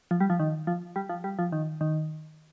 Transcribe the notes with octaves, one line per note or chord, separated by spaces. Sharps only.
F3
G3
F3
D#3
F3
G3
F3
G3
F3
D#3
D#3